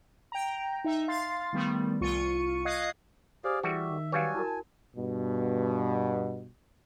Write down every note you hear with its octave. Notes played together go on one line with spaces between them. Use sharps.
G5 A#5
D#4 E5
F5 C6 A6
D#3 G3 A3 B3
C2 F4 C#6 C#7 D#7
D#5 F5 D#6 F#6 G#6 C7
G4 G#4 C5 D5 F5
E3 G3 F#4 G#4 E5
D#3
F#3 G3 B4 C#5 F5 G#5
E4 F#4 A#4 A5
G2 B2